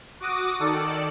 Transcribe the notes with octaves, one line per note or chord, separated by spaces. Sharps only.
F#4 D6 D#6
D#3 A4 D5 C#7